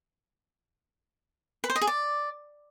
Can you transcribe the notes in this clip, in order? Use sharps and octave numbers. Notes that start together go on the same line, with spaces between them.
B4
C5
D#5
G#4
D5